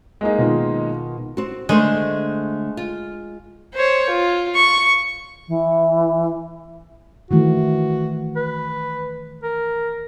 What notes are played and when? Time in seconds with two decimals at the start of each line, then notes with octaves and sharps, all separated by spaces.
0.21 G#3 A#3 D#4
0.38 B2 D#3 F4
1.37 C4 F#4
1.69 D3 G#3 A3 C5
2.77 F4
3.74 C5 C#5
4.10 F4
4.55 C#6
5.48 E3
7.31 D#3 E3 A3 F#4
8.36 B4
9.43 A#4